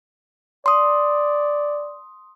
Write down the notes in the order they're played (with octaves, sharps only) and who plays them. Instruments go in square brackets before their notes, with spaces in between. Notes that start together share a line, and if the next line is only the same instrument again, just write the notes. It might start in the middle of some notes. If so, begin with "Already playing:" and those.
[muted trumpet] D5 [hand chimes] C6 D#6